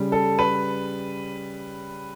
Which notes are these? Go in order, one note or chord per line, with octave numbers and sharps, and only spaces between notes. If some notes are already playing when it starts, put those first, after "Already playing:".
Already playing: C#3 G3
A4
B4